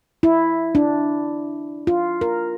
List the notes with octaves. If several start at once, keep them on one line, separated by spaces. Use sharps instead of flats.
E4
D4
F4
A#4